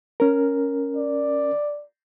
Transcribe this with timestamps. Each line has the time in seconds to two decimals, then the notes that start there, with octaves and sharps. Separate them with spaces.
0.20 C#4 A#4
0.96 D5